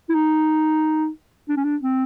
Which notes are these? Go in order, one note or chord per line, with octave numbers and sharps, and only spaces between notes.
E4
D#4
D4
C#4
D4
C4